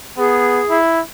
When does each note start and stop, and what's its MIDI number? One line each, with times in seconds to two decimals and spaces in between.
0.18 0.62 59
0.18 0.76 68
0.70 1.01 64